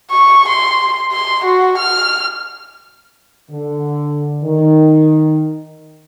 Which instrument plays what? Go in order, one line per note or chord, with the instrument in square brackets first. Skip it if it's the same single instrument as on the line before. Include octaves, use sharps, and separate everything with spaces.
[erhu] C#6
C6
C6
F#4
F6
[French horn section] D3
D#3